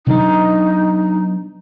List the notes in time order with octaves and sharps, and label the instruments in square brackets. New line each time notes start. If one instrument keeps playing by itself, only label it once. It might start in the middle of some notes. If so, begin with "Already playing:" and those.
[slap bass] B2 F#3 D4 [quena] D#4